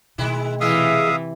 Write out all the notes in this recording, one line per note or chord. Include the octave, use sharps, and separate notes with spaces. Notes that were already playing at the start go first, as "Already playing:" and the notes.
B2 D#3 G#3 A3 E4
C3 E3 G#3 G#4 E5 F5 D#6